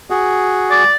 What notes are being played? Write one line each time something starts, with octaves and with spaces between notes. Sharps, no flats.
F#4 G#4
D5